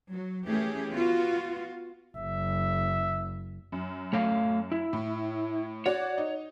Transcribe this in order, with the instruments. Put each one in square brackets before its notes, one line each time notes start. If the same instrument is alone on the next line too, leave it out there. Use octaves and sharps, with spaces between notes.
[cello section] F#3
E3 A3 C#4 G4 G#4
B3 F4 F#4
[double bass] F#1 [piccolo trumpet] E5
[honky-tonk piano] F#2
[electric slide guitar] A3 C#5 F5
E4
[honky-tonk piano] A2
[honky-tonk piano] F#4 D5 F#5 [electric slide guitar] C#5
[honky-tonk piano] D#4